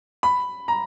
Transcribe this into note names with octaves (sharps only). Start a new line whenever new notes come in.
B5
A#5